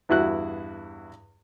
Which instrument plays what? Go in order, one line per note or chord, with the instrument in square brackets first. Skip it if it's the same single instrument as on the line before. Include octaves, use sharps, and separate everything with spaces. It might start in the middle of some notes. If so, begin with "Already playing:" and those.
[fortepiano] E2 G2 E4 F#4 F#6